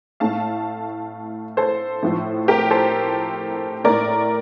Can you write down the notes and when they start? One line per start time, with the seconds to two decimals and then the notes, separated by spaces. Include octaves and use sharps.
0.20 A2 A3 F5 A5
1.57 A4 C5
2.03 A2 F3 A3
2.48 G4 A#4
2.70 A4 C5
3.84 A2 A3 A#4 D5